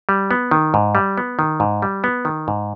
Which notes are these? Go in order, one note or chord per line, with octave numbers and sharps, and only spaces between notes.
G3
B3
D#3
G#2
G3
B3
D#3
G#2
G3
B3
D#3
G#2